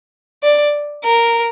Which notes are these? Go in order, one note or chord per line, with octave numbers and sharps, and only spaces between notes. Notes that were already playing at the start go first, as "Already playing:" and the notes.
D5
A#4